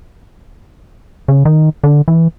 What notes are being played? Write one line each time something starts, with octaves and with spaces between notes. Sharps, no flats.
C#3
D#3
D3
E3